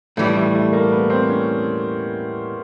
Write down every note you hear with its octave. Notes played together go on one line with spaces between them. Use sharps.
A2 E3 G3 A3
A3
A3
A#3
B3
C4
C#4